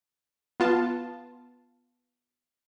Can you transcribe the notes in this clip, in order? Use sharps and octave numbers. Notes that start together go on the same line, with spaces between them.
B3 F4 A5